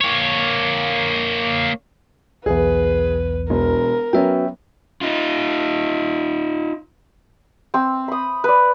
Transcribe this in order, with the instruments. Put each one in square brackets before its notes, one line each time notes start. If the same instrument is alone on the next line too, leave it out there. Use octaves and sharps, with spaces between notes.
[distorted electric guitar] A#3 C#5
[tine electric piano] B1 E2 [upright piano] G#4 [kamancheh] B4
[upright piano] E1 [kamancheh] A#4
[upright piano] F#3 B3 C#4 [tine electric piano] E5 G5
[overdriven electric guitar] D#4 F4
[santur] C4 E6
B5 D#6
B4 D5